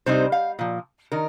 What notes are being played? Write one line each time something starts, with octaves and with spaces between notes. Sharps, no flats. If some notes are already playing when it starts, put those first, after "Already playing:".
C3 G3 C4 D#4 C5
F5
A#2 F3
D#3 A#4